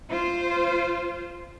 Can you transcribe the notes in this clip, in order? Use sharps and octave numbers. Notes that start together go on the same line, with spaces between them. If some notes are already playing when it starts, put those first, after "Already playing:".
F4 C5